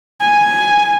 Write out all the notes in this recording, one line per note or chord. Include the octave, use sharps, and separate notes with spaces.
G#5